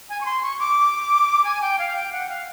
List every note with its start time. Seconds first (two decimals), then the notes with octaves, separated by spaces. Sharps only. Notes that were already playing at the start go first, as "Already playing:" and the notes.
0.09 G#5
0.21 C#6
0.25 C6
0.43 C#6
0.59 D6
1.44 G#5
1.62 G5
1.79 F5
1.96 G5
2.12 F#5
2.29 F5